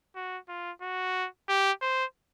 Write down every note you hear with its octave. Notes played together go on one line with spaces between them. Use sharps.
F#4
F4
F#4
G4
C5